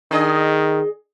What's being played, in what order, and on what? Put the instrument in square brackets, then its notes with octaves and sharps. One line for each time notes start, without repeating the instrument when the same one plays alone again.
[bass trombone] D#3 [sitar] D4 G#4 D#5